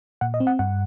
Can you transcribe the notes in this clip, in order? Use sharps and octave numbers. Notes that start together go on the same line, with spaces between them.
A#2 F#5
D#5
C4
F#5
G2 F#5